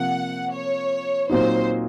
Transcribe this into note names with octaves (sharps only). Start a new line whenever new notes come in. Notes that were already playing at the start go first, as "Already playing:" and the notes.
Already playing: C3 F3 A#3 F#5
C#5
A#2 F#3 C4 D#4 C5